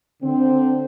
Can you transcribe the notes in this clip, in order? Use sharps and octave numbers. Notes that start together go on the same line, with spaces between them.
D3 C4